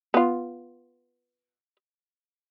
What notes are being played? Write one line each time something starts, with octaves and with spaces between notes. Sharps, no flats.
B3 F4